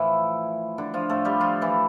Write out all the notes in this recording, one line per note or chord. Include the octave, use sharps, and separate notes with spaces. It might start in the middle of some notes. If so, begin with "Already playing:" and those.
Already playing: A2 E3 F3 E4
D3 D4
F3 F4
A2 F3 A3 A4
G3 G4
F3 F4
E3 E4